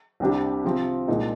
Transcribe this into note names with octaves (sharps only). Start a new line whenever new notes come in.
C2 C3 G3 D4 G4
C3 F3 C4
C2 A#2 G#3 D#4